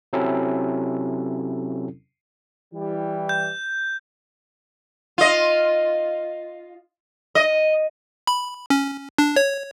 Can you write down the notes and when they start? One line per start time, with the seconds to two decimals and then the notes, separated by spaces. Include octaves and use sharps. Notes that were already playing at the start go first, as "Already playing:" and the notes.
0.13 C3 F#3 C4 C#4 E4 A4
2.73 E3 G3
3.29 G6
5.18 F4 D#5
7.35 D#5
8.27 B5
8.70 C#4
9.18 D4
9.36 C#5